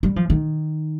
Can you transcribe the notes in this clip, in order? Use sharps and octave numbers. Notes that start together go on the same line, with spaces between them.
G3
F3
D#3